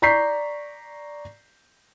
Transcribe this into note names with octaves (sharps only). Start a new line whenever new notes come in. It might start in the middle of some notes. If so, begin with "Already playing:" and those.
D5 A#5 C#6 G6 B6 C7